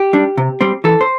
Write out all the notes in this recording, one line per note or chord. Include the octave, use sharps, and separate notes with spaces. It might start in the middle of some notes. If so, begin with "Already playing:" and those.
Already playing: G4
G3 D4
C3
G3 C4
E3 A4
C5